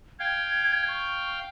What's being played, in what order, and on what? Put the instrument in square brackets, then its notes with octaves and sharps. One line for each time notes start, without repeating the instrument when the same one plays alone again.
[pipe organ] F5 G5 [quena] G#6
[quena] C#6